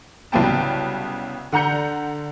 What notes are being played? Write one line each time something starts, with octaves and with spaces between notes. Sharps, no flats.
C2 C#3 F#3 B3 G5 A5
D3 F#5 A#5 G6 C#7